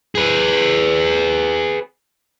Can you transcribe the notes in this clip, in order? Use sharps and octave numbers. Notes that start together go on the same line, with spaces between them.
G#4 B4